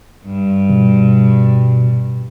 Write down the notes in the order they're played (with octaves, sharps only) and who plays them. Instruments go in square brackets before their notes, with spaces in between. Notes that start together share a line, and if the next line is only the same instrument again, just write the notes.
[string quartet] G2
[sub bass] B2